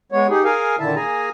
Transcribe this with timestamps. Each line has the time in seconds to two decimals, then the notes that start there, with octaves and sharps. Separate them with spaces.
0.12 G#3 B3 C#5
0.29 D#4 G4 G#4
0.44 G#4 A#4 F5 G#5
0.79 A#2 D3 D#3 E4 E5 A5
0.95 A#3 G#4 G#5 A#5